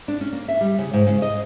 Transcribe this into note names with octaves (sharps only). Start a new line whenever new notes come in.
D4
C#4
A#3
E5
G3
C#3
G#2
C#3
D#5